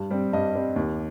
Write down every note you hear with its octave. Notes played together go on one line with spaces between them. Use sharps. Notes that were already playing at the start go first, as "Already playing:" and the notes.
Already playing: G2
G3 C4
G2 D#5
G3 C4
D#2